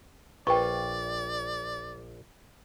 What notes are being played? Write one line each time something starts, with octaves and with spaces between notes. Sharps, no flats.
A#1 F4 B4 D5 G5 C#6